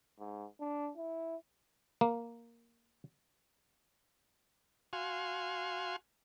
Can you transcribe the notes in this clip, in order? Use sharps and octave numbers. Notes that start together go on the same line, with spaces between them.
G#2
D4
E4
A#3
F#4 F5 G#5 C6